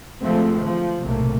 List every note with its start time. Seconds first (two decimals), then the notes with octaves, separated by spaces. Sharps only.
0.20 D2 F3 G#3 A3 C4
0.63 F3
1.04 B1 A2 C3 A3 A#3